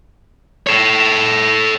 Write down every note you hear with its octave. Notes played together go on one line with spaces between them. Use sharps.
A4 C#5